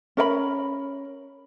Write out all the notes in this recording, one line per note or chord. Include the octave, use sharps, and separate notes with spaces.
C#4 A#4 D5 B5